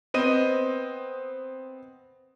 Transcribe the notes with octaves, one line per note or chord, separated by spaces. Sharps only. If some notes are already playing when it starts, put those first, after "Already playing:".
B3 C4 D#5 D#7